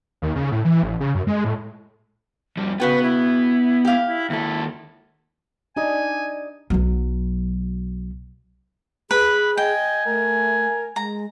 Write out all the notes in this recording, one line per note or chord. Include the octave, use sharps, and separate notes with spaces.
D#2
C#3
A2
E3
A1
C#3
F#2
G#3
A2
F2 G3
C#3 B3 F#4 B4 G5
E4
G4 F5
E4
D#2 E4 A4
D4 D#4 G4 G#5
B1 F#3
G#4 B4 B5
D#5 G5 G#5
A3 A#4
G#3 A#5